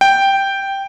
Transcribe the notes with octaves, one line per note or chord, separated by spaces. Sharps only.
G5